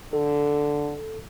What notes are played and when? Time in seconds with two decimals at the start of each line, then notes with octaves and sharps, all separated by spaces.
0.13 D3 A4